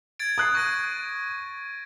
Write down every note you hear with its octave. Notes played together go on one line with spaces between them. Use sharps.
G#6 A6 D7
D#6 F#6 C7
C#6 A#6 D#7